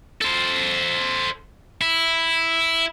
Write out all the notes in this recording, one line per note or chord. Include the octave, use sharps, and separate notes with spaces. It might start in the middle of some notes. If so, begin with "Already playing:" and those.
A4 C5
E4